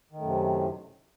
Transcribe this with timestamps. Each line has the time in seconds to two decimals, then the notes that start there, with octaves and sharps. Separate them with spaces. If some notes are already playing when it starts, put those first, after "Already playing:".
0.12 D#3
0.17 A2
0.22 F#2
0.26 C3